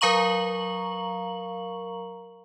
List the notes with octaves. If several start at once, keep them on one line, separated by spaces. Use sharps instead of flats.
F#3 A#4 F5 A#5 C#6 F#7